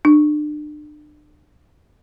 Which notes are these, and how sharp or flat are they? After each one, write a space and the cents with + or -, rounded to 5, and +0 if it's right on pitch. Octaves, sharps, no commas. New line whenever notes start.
D4 +35